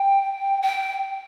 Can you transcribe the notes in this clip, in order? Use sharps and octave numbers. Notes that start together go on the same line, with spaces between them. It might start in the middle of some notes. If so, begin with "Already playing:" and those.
Already playing: G5
G5